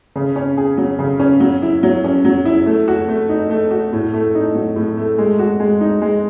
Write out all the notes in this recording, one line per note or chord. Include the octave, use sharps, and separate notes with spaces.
C#3
C#4
G#4
F#3
C#3
C#4
F#3
E4
F#3
C#4
F#3
E4
A3
F#4
A3
D#4
A3
F#4
A2
A3
D#4
F#3
A2
A3
G#3
F#4
G#3
D#4
G#3